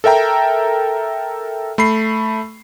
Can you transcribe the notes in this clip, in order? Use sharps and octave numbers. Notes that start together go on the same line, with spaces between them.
A4 A#4 E5 G5 A#5
A3 B5 C7